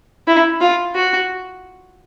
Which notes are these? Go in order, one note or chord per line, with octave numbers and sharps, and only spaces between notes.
E4
F4
F#4